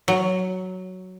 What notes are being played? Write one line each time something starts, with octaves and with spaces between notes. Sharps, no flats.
F#3